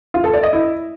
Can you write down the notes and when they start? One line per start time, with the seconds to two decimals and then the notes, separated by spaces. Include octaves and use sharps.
0.14 F4
0.24 A4
0.34 D5
0.43 D#5
0.53 E4